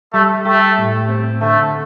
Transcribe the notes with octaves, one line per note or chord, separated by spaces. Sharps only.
G3 A3
A3 G4
A2
C4
D3 A3